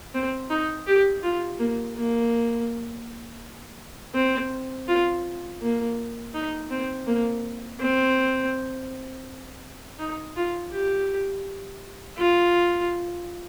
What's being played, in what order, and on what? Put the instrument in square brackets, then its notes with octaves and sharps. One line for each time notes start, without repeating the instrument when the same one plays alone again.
[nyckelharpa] C4
D#4
G4
F4
A#3
A#3
C4
F4
A#3
D#4
C4
A#3
C4
D#4
F4
G4
F4